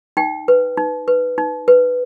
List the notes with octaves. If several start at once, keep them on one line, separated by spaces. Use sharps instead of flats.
D#4 G5
B4
D#4
B4
D#4
B4